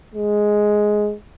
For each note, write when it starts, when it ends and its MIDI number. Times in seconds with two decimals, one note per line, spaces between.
0.15 1.14 56